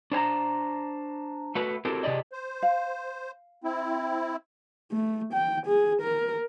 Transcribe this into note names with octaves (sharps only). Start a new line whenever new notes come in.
D4 C5 G#5 A#5
A3 F#4 B4
C4 E4 F#4 G4 A4 A#4
C3 G4 G#4 D5 D#5
C5
F5
C4 E4
A3
G5
G#4
A#4